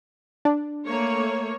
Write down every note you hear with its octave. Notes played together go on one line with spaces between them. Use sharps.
D4
A3 A#3 C#5